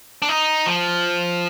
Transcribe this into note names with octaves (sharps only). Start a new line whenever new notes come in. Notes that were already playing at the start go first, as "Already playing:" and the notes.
D4
D#4
F3